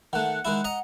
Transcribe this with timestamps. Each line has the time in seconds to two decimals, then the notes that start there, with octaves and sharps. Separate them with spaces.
0.13 D#3 A3 F#5
0.45 D#3 G#3 E4
0.64 D#5 A#5